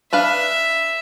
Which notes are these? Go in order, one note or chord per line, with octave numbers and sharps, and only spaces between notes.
D4 B4 E5 F5